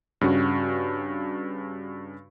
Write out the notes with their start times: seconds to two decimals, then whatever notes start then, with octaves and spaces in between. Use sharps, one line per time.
0.21 G2 C#3 C#4 F#4